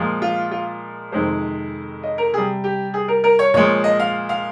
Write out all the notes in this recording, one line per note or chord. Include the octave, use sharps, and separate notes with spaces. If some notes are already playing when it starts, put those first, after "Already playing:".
Already playing: A#2 F3 G#3
F4
F4
F2 C3 D#3 G#3 C5
D#5
A#4
C3 G3 G#4
G4
G#4
A#4
A#4
C#5
A#2 F3 G#3 C#5
D#5
F5
F5